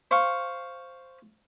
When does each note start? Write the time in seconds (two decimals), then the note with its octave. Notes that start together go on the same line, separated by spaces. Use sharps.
0.11 C5 F5 C6 C#6